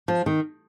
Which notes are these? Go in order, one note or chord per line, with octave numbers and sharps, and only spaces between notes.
F3
D#3